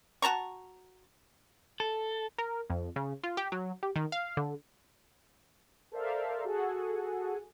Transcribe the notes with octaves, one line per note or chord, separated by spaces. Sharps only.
F#4 A5 A#5 C#6
A4
A#4
F2
C#3
F4
G4
F#3
G4
D#3
F5
D3
A4 A#4 C5 D5 E5 F5
F#4 G#4 A4 F#5 G#5